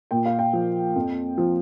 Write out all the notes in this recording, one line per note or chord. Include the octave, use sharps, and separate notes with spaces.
A#2 G5
F5
G5
F3
F2
F3